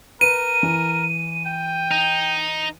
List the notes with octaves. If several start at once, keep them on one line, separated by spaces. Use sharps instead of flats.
A#4 B4 D#7
E3
G5
D#4